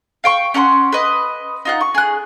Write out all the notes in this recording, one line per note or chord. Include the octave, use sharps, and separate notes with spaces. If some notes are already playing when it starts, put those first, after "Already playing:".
F5 G5 C#6
C#4 F#5 A#5 C6
B4 D#5
D#4 F4 F#5
C#6
G#4 F#6